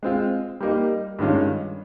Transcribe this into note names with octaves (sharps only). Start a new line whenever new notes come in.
G#3 C4 F4
G3 A#3 D#4
G2 D#3 G#3 C#4 F4